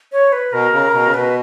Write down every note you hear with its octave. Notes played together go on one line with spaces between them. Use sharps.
C#5
B4
B2 A#4
C#3
B2
C#3
B2 B4